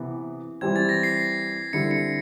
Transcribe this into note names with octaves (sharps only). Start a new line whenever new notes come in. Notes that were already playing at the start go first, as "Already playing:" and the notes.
Already playing: C3 E3 B3
E3 G3 C4 G#6
A6
A#6
C7
D3 G3 C4 E4 C#7
C#7